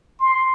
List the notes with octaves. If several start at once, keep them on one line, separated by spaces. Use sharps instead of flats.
C6